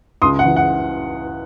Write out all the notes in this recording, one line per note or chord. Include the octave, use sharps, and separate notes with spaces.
C#2 C6 D#6
F#5
E3
F#5